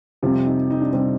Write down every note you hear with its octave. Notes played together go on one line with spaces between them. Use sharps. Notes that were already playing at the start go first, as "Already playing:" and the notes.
F2 C3 G3 C4 F4
D#4
D#4
D4
C3 G3 C4 D#4